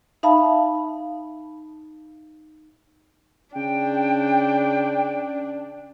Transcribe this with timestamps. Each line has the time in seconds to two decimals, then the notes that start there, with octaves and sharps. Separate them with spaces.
0.23 D#4 E5 F5 A5 B5
3.56 C#3 D4 G5